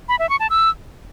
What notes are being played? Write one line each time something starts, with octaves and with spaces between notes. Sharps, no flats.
B5
E5
C#6
A5
E6